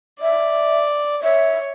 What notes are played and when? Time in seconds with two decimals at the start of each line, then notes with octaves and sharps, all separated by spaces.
0.21 D5 E5
1.23 C#5 E5